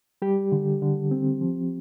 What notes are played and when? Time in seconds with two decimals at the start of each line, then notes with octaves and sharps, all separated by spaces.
0.22 G3 G4
0.52 D3
0.82 D3
1.11 C4
1.41 F3